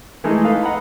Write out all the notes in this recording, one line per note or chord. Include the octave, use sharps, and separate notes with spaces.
E3 G#3 A3 D#4
A4 B4 F5
D#5 F#5 A#5 B5